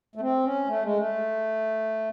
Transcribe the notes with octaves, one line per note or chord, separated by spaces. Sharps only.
A3
C4
C#4
A3
G#3
A3